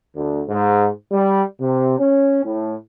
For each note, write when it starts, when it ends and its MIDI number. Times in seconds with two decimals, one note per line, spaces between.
0.16 0.43 38
0.49 0.89 44
1.11 1.42 55
1.60 1.94 48
1.98 2.43 61
2.45 2.74 45